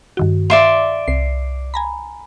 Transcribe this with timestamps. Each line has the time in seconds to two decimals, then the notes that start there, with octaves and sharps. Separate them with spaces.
0.17 G2 D#3 F#4
0.50 D5 E5 F5 C6
1.08 C2 C7
1.74 G#5 A#5 B5